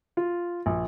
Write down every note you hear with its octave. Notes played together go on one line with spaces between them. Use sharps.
F4
A#1